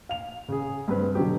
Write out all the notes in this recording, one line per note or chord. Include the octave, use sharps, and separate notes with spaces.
F5 F7
C#3 G#4
G2 C4 B4
B2 D3 F#3 G4